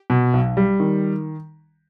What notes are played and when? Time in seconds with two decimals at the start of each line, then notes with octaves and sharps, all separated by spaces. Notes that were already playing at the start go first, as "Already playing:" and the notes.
Already playing: G4
0.10 B2
0.33 B1
0.57 G3
0.80 D#3